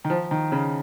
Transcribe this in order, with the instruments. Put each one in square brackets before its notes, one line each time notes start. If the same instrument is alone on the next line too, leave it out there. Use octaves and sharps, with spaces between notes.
[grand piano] D#3
F3
D#3
C#3